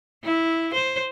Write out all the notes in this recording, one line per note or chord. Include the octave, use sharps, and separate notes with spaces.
E4
C5